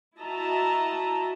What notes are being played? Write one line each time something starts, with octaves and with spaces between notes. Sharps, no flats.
E4 F#4 D#5 E5 A5 A#5